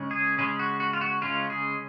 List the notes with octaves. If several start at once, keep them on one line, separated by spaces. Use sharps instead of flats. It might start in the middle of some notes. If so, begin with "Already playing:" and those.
Already playing: C#3 G#3 C#4
G#4
C#3 G#3 C#4 G#4
F#4
F#4
F4
F#4
C#3 G#3 C#4 F4
G#4